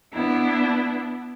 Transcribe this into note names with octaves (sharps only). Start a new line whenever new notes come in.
B3 D4 E4